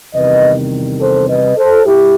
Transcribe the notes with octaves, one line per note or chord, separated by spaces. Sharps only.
E2 C3 D#3 G3 B4 D#5
A4 C5
B4 D#5
A4 C5
G2 E4 G4